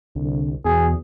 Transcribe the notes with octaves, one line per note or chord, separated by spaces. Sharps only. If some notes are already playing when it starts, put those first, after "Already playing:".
C2 D3
E2 B2 G#4